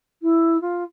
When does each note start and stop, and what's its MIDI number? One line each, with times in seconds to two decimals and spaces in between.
0.22 0.60 64
0.61 0.84 65